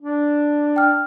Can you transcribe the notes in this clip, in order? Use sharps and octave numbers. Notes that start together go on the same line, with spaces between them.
D4
G5 F6